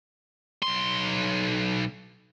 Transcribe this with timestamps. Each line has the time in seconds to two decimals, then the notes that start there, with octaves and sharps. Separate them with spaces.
0.62 B1 C6